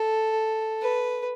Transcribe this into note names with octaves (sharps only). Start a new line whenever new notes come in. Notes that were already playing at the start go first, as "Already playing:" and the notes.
Already playing: A4
B4